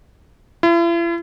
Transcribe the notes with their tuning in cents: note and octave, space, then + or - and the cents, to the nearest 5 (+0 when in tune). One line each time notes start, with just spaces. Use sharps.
E4 +45